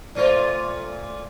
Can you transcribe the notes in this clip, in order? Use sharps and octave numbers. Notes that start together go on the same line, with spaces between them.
A#2 A3 F4 C5 D5